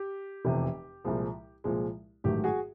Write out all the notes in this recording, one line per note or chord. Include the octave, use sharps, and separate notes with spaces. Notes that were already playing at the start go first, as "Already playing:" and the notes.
Already playing: G4
F1 E2 C3 E3
C2 A#2 F3 G#3
C2 A#2 F3 G#3
A1 G#2 D#3 F#3 A3 G4
F#4 G#4